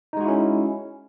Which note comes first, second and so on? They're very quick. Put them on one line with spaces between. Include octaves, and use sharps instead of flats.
D#4 G#3 F#4 E4 C#4